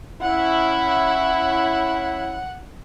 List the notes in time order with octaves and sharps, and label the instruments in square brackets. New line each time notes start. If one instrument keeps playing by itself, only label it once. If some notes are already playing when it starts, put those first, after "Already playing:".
[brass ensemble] C#4 E4 [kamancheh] F#5